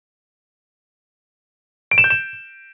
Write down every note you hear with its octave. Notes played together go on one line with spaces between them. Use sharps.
D7
E7
G6
E7